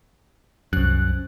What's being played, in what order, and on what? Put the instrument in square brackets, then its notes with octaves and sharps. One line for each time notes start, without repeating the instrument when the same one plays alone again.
[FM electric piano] C2 F#6 [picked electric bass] F#2